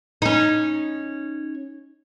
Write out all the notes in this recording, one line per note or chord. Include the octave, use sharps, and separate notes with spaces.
C#4 D#4